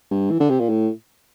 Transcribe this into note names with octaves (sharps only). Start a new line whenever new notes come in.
G2
E3
D3
C3
A#2
A2